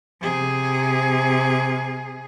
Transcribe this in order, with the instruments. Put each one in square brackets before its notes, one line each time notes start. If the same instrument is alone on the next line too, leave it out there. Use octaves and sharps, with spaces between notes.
[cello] C3 G#4